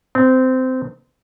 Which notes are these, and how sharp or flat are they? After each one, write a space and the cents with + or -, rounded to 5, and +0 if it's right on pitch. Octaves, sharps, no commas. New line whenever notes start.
C4 -20